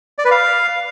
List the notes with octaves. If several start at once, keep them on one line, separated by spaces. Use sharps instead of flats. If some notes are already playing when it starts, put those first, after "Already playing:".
D5
B4
F5